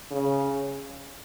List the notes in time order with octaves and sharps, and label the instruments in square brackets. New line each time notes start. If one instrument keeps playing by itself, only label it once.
[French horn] C#3